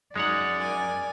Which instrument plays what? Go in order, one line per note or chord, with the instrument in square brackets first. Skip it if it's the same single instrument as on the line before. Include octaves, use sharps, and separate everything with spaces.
[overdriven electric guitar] F#2 [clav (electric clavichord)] G#3 C#5 F#5 [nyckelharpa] D#4 [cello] D5
[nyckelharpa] A#4 G#5